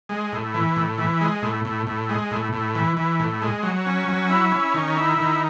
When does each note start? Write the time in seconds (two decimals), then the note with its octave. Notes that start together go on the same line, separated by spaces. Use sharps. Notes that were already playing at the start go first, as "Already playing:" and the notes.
0.09 G#3
0.32 A2
0.54 E3
0.76 A2
0.98 E3
1.21 G#3
1.42 A2
1.65 A2
1.87 A2
2.09 G#3
2.31 A2
2.53 A2
2.75 E3
2.97 E3
3.20 A2
3.42 G#3
3.63 F#3
3.86 C#4
4.09 F#3
4.29 E4
4.52 C#4
4.74 D#3
4.97 E4
5.18 D#3